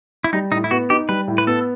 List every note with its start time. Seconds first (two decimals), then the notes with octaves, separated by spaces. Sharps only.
0.24 E4
0.33 G3 D#4
0.52 A2 D#4
0.64 E4
0.71 B3 F#4
0.90 D#4 G4
1.09 G3 B4
1.28 A2
1.38 B4
1.47 B3 A4